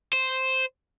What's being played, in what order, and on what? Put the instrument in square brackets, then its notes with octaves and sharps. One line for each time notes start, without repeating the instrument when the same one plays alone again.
[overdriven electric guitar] C5